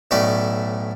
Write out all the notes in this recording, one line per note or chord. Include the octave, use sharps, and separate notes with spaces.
B1 A2 A3 C#4 D5 D#5